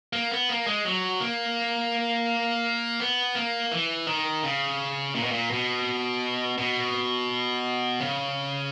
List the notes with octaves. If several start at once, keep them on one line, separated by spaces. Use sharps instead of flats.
A#3
B3
A#3
G#3
F#3
A#3
B3
A#3
E3
D#3
C#3
A#2
B2
A#2
B2
B2
C#3